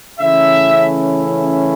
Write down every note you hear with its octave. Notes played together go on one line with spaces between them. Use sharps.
C#3 E3 A3 C#4 E4 E5